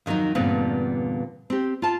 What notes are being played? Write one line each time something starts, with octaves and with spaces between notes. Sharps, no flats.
F2 D#3 E3 F#3 D#4
E2 G2 A#2 D3 B3 C4
C4 G4
F4 A5